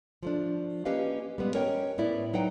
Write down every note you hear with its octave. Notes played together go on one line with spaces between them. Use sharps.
F3 A3 D4
A#3 C#4 G4 B4 D#5 F5
G3 G#3 B3
C#4 A#4 C#5 D#5 G5
A2 B3 E4 D5
F#3 D#4 B4 F#5 G5